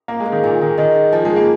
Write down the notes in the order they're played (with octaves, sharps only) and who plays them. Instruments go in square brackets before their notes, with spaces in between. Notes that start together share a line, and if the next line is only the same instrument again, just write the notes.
[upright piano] A#3 [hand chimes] F5
[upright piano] G#3
[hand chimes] G#4
[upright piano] D#3
[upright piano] A#2 [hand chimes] G#5
[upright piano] D#3 [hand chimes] G#4
[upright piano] D#3 [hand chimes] D#5
[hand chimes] G#4
[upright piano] F3 [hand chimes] G#5
[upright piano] G#3
[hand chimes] G#4
[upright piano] A#3